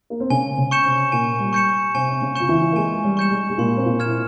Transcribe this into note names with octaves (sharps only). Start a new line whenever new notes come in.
A#3
C4
C#3 C#4 G#5
C#3 C#4
C#6 G6 C#7 E7
C3 C4
A#2 A#3 G#5
G3
C#6 G6 C#7 E7
C3 C4 G#5
C4
C#3 C#4
F4 C#6 G6 C#7 E7
E3 E4
A#3
G#3 G#5
G3
C#6 G6 C#7 E7
G#3
G#3
A#2 A#3 C6
C4
A#2 A#3
F6 G#6 E7
E4